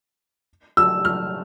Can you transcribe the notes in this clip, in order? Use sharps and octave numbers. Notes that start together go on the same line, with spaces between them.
E6
F6